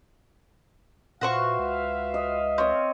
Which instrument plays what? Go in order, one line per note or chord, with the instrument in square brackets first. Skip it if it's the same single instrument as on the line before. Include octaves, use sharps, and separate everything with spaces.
[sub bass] A#2 [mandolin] F#4 C5 C#6 [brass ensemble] B4 E5 F5
[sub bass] C#2
[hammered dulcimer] D#5
[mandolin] C4 [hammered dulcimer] C#5 D#5